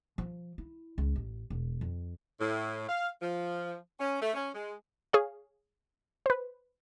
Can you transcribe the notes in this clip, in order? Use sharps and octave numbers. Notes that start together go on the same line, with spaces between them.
F3
E4
C#2
A1
E1
F2
A2
F5
F3
C#4
A3
C#4
G#3
G#4 C#5 F5
B4 C5